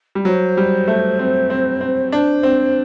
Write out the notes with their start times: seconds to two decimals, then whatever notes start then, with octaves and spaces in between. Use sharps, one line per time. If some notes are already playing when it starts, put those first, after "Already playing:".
0.15 G3
0.25 F#3 C5
0.57 G3
0.88 A3
1.19 C4
1.50 C4
1.81 C4
2.12 D4 C5
2.43 C4